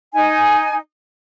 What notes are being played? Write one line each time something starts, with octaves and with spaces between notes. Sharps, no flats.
D#4 G#5